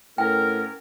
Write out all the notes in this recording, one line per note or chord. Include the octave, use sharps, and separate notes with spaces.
A2 B3 C#4 A#4 G5